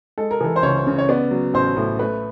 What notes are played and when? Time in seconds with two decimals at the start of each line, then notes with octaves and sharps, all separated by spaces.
0.18 G#3 A4
0.31 A#4
0.41 E3 A4
0.56 C5
0.63 C#2 C#5
0.87 C#3
0.98 C#5
1.09 B3 D5
1.31 F#3
1.54 A1 C5
1.77 A2
1.99 A3 B4